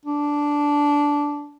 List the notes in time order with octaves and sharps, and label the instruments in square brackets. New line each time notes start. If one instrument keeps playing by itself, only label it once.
[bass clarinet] D4